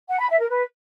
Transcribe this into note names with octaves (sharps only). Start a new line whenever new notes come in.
F#5
B5
E5
A#4
B4